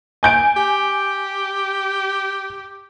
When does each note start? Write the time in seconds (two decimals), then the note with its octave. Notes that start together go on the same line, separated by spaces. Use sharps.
0.23 G#5 G6 D7
0.56 G4